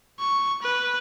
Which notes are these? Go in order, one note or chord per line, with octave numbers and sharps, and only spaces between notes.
C#6
B4